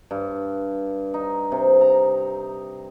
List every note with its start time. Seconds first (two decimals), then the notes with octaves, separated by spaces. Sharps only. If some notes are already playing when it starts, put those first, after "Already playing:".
0.11 G2
1.14 D#4
1.52 C3
1.81 A#5